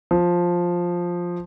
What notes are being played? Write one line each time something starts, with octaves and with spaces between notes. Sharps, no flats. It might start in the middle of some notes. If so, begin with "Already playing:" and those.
F3